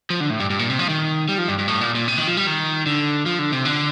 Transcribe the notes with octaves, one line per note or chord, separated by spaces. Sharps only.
F3
D3
A2
G2
G2
A#2
C3
F3
D#3
G3
F3
G2
G2
A2
A#2
A#2
C3
D#3
F3
G3
D#3
D3
F3
D3
C3
D3